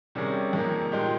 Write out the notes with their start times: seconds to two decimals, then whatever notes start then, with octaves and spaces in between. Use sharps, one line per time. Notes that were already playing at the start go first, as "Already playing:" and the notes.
0.15 C3 D#3 G3 C#4 G#4
0.53 F2 D#3 A#3
0.92 A#2 G#3 D#4 G4